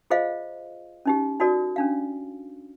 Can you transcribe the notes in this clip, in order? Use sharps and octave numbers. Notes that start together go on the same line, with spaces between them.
F4 G#4 C5 D#5 F5
C#4 D#4 G4
D#4 F#4 A4 A#4 D5
C#4 D4 F5